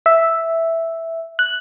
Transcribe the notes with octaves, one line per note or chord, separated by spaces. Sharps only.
E5
F#6